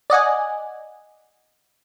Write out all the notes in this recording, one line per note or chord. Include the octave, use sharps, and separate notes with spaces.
D5 D#5 F#5 G#5